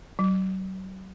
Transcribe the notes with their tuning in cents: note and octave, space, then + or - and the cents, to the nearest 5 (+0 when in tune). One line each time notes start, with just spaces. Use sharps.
F#3 +40